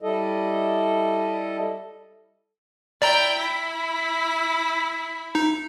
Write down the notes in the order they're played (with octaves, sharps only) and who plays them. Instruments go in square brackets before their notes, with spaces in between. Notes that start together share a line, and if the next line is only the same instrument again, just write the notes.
[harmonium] G3 E4 A4 D#5
[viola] E4 G5 [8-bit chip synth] D5 A#5
[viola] E4 B5
[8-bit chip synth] D#4